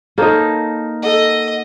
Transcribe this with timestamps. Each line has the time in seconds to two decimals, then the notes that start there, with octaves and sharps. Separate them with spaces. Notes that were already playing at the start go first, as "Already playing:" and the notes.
0.18 A#3 D#4 A4 C5 C#5
1.03 A4 D#5 F#5